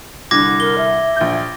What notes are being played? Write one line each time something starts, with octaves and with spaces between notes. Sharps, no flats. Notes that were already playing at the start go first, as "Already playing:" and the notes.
C2 D3 D6 G#6 A#6
A#4 G7
E5
A#1 G6